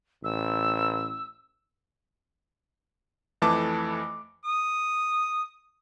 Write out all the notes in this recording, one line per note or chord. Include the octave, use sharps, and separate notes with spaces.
A1 E6
F2 E3 A3 A5 D6
D#6